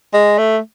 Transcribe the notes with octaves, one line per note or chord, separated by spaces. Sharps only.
G#3
A3